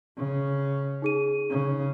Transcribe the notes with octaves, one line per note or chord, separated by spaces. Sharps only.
C#3
D#4 G#4 D#7
C#3